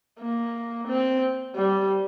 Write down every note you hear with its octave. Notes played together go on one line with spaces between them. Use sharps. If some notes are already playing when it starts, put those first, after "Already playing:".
A#3
C4
G3